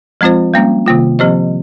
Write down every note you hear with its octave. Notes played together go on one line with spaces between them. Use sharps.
F3 G#3 C4 F4 C5
G3 A#3 C#4
C3 D#3 A#3 F4
F3 C4 G4 C5 D#5